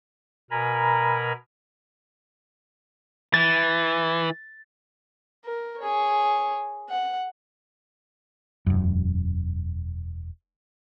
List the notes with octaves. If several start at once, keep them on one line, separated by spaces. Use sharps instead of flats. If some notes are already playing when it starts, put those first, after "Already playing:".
B2 A#4 G#5 A#5 B5
E3 A6
A#4
G#4 C#5
F#5
E1 F#2